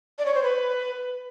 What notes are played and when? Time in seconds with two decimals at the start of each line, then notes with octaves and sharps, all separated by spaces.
0.19 D5
0.26 C#5
0.35 C5
0.43 B4